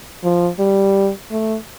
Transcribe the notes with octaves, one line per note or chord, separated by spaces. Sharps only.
F3
G3
A3